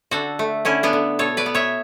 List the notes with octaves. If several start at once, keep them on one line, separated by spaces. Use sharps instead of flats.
D3 F#4 A4
A3
D3 C#4 E4
B3 D4
D3
B2 A4 C#5
B4 D5
B3
C#5 E5